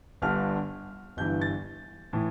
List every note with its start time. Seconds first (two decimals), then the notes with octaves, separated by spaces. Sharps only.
0.22 G1 G2 D3 F6
1.17 G1 G2 E3 G6
1.41 A6
2.13 A2 E3